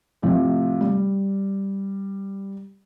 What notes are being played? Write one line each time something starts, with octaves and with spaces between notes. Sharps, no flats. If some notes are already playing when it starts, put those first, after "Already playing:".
A2 C3 F3
G3